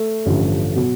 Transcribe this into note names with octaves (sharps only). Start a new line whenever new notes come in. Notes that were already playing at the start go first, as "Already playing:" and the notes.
Already playing: A3
A1 G2 D3 F3
B2 F#3